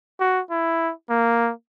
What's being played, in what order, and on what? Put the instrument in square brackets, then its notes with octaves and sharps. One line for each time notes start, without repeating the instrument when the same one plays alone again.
[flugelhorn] F#4
E4
A#3